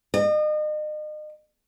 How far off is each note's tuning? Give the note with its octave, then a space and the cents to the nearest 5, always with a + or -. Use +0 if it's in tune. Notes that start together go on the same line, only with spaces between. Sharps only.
D#5 -35